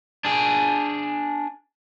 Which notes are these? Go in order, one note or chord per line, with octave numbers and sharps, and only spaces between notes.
D4 G#4